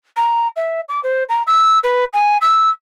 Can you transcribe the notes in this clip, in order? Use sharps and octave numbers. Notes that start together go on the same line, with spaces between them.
A#5
E5
D6
C5
A#5
E6
B4
G#5
E6